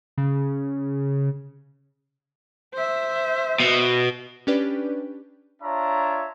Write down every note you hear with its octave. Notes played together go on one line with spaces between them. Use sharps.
C#3
C5 E5
B2
C#4 D4 G4 B4 D5
D4 F4 C#5 E5 A#5